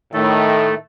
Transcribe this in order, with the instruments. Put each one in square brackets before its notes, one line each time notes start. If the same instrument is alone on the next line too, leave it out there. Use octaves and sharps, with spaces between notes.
[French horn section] A2 D#3 [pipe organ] A3 A4